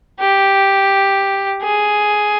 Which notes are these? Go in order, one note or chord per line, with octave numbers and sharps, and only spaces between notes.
G4
G#4